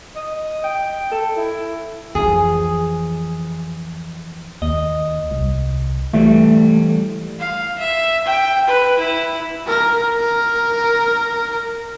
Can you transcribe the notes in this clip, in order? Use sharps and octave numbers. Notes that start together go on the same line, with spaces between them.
D#5
G5
A4
E4
F2 E3 G#4
D#2 D#5
C2
E3 G3 A3
F5
E5
G5
B4
E4
A#4
A#4